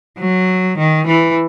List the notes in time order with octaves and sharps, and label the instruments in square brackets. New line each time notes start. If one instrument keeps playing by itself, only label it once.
[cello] F#3
D#3
E3